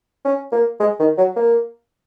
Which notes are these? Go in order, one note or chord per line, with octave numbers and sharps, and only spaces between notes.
C#4
A#3
G#3
D#3
F#3
A#3